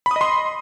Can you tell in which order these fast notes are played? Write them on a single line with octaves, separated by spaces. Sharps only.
B5 D#6 D#5 C6